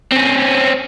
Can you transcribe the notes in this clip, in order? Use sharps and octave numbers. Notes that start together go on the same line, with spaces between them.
C4 C#4